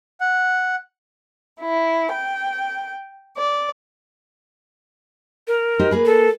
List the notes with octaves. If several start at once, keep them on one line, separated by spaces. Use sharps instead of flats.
F#5
E4
G5
D5
A#4
D#4 G4 C5
A#3 G#4 B4
A4